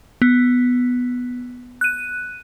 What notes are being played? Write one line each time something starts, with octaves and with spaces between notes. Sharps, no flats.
B3
F#6 D#7